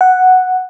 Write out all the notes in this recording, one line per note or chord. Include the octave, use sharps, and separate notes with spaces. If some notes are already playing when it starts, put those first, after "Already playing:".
F#5